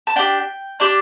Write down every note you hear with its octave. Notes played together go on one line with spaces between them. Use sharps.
A5
D4 G4 G5
D4 G4